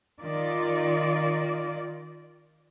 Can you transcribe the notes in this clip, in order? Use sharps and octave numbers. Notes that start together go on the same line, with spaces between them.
D#3 F4 D5